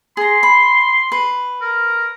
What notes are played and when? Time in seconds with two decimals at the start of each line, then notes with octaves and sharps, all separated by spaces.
0.17 G#4 A#5 C6
0.43 B5
1.12 B4
1.62 A#4